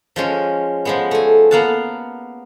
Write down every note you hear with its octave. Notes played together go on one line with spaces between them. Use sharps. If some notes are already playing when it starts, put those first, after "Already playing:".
F3 G#3 C#4
F3 G#3 B3
A3 G#5
A#3 B3 F5 F#5 A5